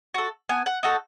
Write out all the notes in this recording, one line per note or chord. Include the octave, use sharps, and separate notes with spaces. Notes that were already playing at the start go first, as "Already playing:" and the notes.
F#4 A4
B3 G#5
F#5
D#4 F#4 A4 F#5